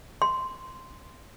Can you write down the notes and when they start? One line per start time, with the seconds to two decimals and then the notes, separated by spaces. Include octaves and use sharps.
0.22 C6